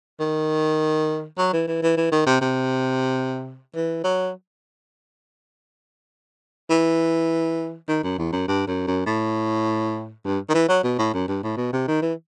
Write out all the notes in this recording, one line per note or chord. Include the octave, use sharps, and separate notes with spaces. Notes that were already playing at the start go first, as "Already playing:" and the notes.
D#3
F#3
E3
E3
E3
E3
D#3
C3
C3
E3
F#3
E3
D#3
F#2
E2
F#2
G2
F#2
F#2
A2
G2
D#3
E3
F#3
B2
A2
F#2
G2
A2
B2
C3
D#3
E3